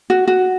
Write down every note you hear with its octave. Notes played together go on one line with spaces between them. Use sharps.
F#4
F#4